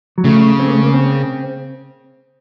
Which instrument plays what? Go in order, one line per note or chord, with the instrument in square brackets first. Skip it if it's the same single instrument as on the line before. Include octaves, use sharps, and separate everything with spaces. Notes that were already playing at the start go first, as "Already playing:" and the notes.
[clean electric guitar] F#3
[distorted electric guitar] C#3 [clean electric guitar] A3
[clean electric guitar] C4
A#3
A3
A#3
C4